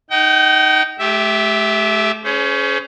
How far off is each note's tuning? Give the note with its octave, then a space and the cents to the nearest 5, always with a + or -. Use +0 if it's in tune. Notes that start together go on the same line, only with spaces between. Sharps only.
D#4 +0 G5 -45
A3 -40 G4 +0 E5 +0
C#4 +15 G#4 +35 C5 -25